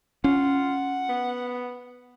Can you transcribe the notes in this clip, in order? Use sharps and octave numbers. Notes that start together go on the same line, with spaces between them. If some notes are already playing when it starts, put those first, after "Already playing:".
C#4 F4 F#5
B3